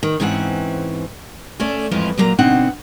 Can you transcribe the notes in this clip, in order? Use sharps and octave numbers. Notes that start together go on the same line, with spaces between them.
D#3
G#2 E3 C4 C#4 G4 F#5
A3 C#4 A4 D5
F2 A2 E3 F3 G#3 F4
A#2 F#3 A#3 B4 A#5
B2 D3 C4 D#4 F#5